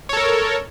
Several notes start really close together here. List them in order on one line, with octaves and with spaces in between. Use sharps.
C#5 A4 A#4